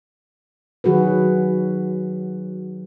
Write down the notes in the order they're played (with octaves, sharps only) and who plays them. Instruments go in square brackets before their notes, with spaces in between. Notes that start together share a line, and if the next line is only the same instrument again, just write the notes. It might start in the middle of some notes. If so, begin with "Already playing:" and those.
[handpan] D#3 F#3 F#4 G#4 B4